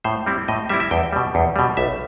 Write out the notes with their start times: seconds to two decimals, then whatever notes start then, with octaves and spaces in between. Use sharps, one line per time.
0.04 A2 C5
0.27 G3 C4 E4
0.48 A2 D#5
0.69 G3 C4 E4 E5
0.80 E5
0.91 E2 G5
1.13 B2 G3
1.35 E2
1.56 B2 G3
1.77 B1 E5